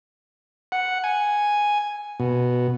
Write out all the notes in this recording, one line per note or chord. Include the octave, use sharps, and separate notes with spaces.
F#5
G#5
B2